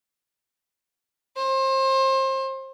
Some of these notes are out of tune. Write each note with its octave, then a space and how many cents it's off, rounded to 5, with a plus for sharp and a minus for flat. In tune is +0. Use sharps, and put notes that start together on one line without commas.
C5 +30